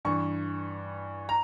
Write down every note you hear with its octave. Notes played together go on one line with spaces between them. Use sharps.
G2 E3 C#6
A#5